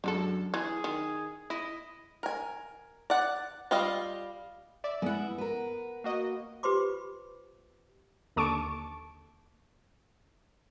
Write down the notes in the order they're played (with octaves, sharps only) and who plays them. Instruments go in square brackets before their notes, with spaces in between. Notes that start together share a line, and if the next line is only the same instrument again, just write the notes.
[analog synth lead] F#2 [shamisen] D3 G#3 A4
[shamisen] E3 [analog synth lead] G#4
[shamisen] D#3
[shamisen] E4 [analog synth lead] D#5
[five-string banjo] A#4 G#5
D5 F#5
G3 F4 D#5 F5
[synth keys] D5 E5
[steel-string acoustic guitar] G#3 E4 [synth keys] B3 F#5
[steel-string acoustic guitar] A#4 B4
[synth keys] A#3 F#4 D#5
[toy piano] F4 G4 B4 C5 C6 D6
[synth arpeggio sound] D#2 D3 A5 C#6 D6 D7